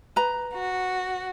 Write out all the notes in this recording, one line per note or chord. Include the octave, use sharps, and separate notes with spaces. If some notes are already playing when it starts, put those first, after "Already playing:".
B4 A#5
F#4